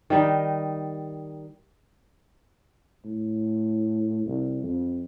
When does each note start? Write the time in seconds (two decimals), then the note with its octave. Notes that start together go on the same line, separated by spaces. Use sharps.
0.10 D#3 G3 D#4
3.05 A2
4.26 C2
4.63 F2